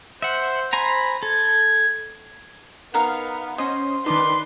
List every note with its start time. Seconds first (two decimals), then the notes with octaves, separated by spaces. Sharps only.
0.22 C5 E5 F#5
0.73 C5 G#5 A#5 B5
1.23 A4 G#6
2.94 B3 D#4 A#4 F5 F#5 F6
3.58 C#4 C5 D#5 C6 D#6
4.06 D#3 D4 D#4 B4 D5 D#5 C6